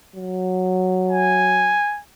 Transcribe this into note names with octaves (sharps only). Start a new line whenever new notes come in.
F#3
G#5